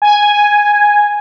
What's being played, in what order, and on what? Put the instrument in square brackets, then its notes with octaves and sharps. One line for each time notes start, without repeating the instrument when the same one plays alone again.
[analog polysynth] G#5